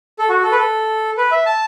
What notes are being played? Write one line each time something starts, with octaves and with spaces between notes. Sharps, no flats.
A4
F#4
A4
B4
A4
B4
E5
A5